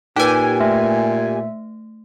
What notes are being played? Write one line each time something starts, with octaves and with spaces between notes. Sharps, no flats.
A#2 D#4 G4 B4 G#5
A3 E5